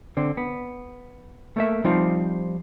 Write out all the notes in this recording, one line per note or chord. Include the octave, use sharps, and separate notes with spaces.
D3 C4
B3
A3 A#3 E5
F3 G3 C4 D#4 F4